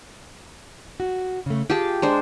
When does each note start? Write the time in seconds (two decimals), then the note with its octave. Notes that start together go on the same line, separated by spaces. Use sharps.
1.00 F#4
1.46 C#3 A3
1.70 F4 G4 G#4 A5
2.02 G#3 D4 C5 A#5